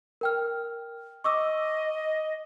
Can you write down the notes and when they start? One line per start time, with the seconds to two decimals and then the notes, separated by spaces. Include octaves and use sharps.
0.21 A#4 G5 F6
1.24 D#5 C#6 D6 E6